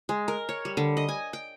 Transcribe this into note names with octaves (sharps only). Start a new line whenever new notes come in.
G#3
A#4
C#5
G3
D3
D#5
G#5
G5